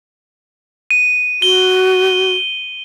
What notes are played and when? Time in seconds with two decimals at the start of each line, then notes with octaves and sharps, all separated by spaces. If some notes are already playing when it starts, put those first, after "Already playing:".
0.91 D#7
1.42 F#4 G7